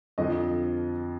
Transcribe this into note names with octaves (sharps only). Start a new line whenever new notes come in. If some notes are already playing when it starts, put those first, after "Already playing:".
F2 D3 F3 D#5